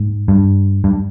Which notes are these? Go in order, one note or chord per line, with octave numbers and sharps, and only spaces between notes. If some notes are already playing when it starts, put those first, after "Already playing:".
Already playing: G#2
G2
G2